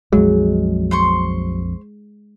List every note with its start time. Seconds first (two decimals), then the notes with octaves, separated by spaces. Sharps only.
0.13 A#1 F2 F#3 G#3
0.91 C5 C6 C#6